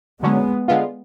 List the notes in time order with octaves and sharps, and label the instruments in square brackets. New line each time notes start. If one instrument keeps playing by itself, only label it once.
[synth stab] D3 F#3 C#4 [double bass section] G#3 B3
[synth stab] D3 G#3 B3 F4